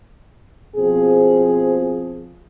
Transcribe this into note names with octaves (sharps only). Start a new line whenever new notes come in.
B2 F3 C4 G#4